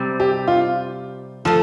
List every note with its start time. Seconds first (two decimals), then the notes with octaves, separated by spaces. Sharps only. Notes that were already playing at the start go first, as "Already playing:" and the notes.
Already playing: C3 G3 C4
0.20 G4
0.48 F4
1.45 F3 A3 A4